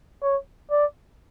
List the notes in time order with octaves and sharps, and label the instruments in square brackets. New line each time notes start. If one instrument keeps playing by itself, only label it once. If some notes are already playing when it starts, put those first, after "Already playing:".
[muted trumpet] C#5
D5